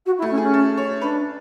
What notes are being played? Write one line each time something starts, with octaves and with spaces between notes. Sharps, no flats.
F#4
E4
A3
C#4
G#4
C#4
A4
C#5
D4 B4